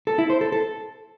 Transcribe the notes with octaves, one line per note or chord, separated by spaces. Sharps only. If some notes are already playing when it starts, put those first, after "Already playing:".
A4
E4
C5
A4
A4